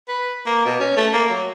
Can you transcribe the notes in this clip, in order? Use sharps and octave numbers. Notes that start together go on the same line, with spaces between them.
B4
A#3
B2
C#4
A3
A#3
F#3